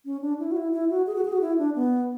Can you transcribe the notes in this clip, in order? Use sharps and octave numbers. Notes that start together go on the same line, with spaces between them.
C#4
D4
E4
F#4
E4
E4
F#4
G#4
F#4
G#4
F#4
E4
D4
B3